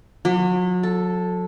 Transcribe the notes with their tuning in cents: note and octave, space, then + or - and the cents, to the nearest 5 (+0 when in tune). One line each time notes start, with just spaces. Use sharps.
F#3 -35
A4 +0